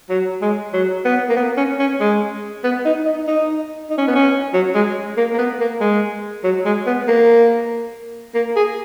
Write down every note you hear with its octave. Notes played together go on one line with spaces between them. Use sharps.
F#3
G#3
F#3
B3
A#3
B3
C#4
C#4
G#3
B3
D#4
D#4
D#4
D#4
C#4
B3
C#4
F#3
G#3
A#3
A#3
B3
A#3
G#3
F#3
G#3
B3
A#3
A#3
G#4